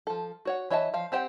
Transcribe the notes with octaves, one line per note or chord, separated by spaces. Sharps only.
F3 A4
F#4 C#5 F#5
E3 C#5 D#5 E5 A5
F3 F5
C4 G4 C5 F#5 G5